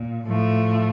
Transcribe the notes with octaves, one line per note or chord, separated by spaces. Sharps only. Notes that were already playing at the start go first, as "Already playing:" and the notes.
Already playing: A#2
A2 F3 A3